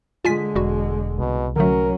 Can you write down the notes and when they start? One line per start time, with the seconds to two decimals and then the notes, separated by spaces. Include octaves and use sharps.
0.25 D3 G#3 F4 G#5 B6
0.55 E1 G3 F#4
1.19 C2 B2
1.56 D3 F#3 A3 C#4 A#4